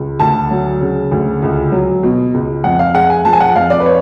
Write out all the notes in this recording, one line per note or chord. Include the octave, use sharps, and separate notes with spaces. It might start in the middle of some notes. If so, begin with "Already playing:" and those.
Already playing: C#2
D2 A5
F#3
C#3
D2
C#2
F#3
B2
C#2
F2 F#5
F5
G#3 F#5
G#5
F3 A5
G#5
F#5
F2 F5
D5
B4
C#5